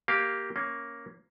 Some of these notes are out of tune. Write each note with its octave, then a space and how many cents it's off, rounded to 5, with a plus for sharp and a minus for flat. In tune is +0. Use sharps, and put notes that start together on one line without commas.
A#3 +0 G4 +0 F5 +0
A#3 +0 C#4 +0